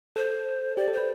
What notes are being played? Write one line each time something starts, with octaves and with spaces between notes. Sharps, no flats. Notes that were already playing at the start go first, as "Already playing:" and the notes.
A4 C5
G4 D5
A4
B4 C5